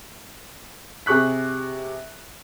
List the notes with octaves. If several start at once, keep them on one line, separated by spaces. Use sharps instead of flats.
C3 G#4 C#6 F#6 B6